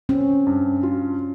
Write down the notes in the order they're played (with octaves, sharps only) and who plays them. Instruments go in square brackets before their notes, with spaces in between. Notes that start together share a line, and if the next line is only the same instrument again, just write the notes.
[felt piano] C4 [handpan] C#4
[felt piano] G2
F4